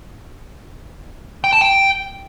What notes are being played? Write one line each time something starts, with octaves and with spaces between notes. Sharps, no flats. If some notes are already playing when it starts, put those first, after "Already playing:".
G5
A5
G5